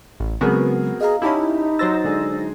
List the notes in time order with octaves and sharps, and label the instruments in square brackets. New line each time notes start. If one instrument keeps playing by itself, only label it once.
[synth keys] A1
[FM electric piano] C#3 F#3 G#3 [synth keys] B3 F#4 [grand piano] C4 G#4 A#4
[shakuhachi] G#4 [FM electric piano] D#5 F5 A#5
[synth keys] C#4 E4 [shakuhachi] D#4 [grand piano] G4 A5 B5
[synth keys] F#3 C5 A#6 [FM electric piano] E6 A6
[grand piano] D3 G#3 G#4